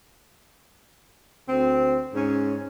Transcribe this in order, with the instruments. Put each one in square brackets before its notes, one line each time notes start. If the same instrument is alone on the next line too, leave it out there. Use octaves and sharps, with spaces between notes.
[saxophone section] D2 C4
G#2 C#4